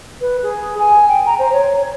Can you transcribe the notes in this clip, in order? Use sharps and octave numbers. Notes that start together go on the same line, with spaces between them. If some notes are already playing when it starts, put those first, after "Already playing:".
B4
G#4
G#5
G5
A#5
C5
C#5